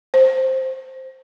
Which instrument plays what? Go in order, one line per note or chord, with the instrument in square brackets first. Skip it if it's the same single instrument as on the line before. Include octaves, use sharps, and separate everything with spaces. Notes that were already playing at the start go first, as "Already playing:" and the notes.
[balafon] C5